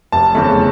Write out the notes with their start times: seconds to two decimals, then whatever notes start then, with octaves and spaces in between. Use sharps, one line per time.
0.12 F1 A5
0.35 E2 C#3 E3 A3